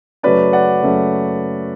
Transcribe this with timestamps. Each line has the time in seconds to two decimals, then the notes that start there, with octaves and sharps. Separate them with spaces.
0.23 F#2 C#3 F#3 A3 C#4 B4 D5
0.53 D5 F#5
0.83 F#2 C#3 F#3 A3 C#4